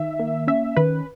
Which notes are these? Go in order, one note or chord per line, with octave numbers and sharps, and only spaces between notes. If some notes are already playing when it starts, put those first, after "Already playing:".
Already playing: D#3 E5
A#3
C#4 E5
D#3 B4